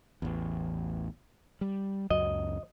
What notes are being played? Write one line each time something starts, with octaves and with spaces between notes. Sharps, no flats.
A1 E2
G3
C#2 F#2 F#3 D#5